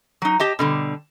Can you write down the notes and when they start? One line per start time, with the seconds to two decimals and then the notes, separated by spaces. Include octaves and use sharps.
0.22 F#3 D#4
0.40 G4 D#5 A5
0.59 B2 D3 G3